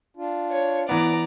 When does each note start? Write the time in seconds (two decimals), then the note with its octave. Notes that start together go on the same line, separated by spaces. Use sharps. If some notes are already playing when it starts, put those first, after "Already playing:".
0.17 D4 F4
0.52 C#5
0.89 E3 B3 D5 A#5